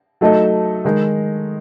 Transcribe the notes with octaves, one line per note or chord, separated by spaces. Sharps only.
F#3 A3 D#4 A4 D#5
D#3 G#3 D#4